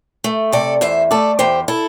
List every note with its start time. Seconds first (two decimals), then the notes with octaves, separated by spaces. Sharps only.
0.24 A3
0.53 C3 A4 D5
0.81 E2 C5 E5
1.11 A3 A4 D5
1.39 E2 G4 C5
1.68 E4 A4